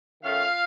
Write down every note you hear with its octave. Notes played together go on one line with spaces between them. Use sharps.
D#3 A3 C#4 F4 F5